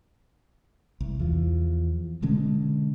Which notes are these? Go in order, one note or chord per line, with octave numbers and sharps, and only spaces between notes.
C2
E2 F3
B2 D3 G#3 C#4